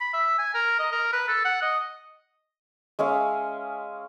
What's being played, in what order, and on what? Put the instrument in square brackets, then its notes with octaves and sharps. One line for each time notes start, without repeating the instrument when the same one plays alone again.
[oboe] B5
E5
G#5
A#4
D#5
A#4
B4
A4
F#5
D#5
[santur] G#3 C#4 E5 F5